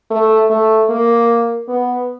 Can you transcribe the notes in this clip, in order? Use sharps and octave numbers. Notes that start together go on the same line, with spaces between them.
A3
A3
A#3
B3